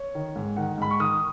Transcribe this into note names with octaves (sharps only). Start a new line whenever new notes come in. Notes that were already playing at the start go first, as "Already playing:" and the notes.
Already playing: C#5
D#3
G#2
D#3 F#5
G#2 B5
C#6
D#3 D#6